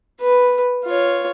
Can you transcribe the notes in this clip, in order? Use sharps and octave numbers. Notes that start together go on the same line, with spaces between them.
B4
F4 C#5